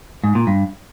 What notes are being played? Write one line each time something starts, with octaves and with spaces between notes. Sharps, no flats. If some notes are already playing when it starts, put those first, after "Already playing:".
G#2
A#2
G2